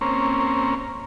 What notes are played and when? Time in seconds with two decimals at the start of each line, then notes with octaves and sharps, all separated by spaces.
0.01 A#3 C4 C#4